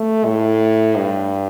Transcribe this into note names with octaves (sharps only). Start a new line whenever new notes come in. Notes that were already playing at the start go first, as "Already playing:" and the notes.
Already playing: A3
A2
G2